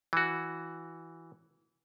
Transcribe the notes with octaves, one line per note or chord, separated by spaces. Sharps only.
E3 F#4